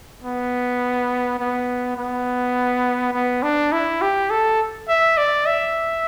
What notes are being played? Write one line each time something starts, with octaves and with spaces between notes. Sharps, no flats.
B3
B3
B3
B3
D4
E4
G4
A4
E5
D5
E5